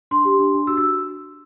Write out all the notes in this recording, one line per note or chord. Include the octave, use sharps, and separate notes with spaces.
D4 C6
G4
D4
D4
F#4 E6
E6